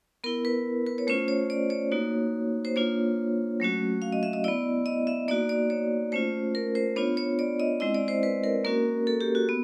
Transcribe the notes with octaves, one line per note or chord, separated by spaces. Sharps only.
B3 E4 A#4
B4
B4
C#5
A3 C#4 F4 C5
C#5
D5
C#5
A#3 D#4 F#4
C5
A#3 D4 F4 C#5
F#3 A3 C#4 F#4
F5
D#5
E5
D#5
B3 E4 D5
D#5
E5
A#3 D#4 F#4 D5
D5
C#5
A3 C#4 F4 C5
A#4
C5
B3 D4 F4 C#5
C#5
D5
D#5
G#3 C4 E4 D#5
D5
C5
B4
A#4
A#3 C#4 F#4 A#4
A4
G4
F#4
B3